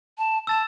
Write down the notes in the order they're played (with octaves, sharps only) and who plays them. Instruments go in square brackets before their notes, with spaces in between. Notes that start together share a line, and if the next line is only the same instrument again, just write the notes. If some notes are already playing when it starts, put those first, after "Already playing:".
[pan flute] A5
[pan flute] A5 [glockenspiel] E6 A6 E7